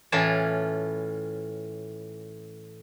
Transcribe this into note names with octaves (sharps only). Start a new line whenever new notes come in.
A2 E3 C#4 F4 A5